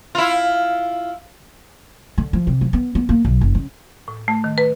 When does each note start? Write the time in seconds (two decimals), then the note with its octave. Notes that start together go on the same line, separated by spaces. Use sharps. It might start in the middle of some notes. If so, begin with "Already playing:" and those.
0.15 E4 F4
2.18 D3
2.33 F3
2.47 C3
2.61 F3
2.73 B3
2.95 B3
3.09 A#3
3.25 B1
3.41 F#1
3.55 C#3
4.08 A2
4.28 A3
4.44 D#3
4.58 B4